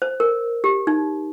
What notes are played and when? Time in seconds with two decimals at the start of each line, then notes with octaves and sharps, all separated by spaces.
0.02 C5
0.20 A#4
0.64 G4
0.87 D#4